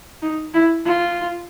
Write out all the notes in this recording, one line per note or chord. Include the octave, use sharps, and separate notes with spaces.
D#4
E4
F4